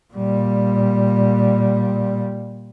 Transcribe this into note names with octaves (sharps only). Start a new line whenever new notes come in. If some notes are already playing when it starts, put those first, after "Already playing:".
A#2 G3